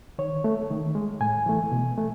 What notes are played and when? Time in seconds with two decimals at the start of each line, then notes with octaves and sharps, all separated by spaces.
0.19 D#3 C#5
0.44 A3
0.70 D#3
0.95 G#3
1.20 A2 G#5
1.46 E3 A3
1.72 B2
1.97 A3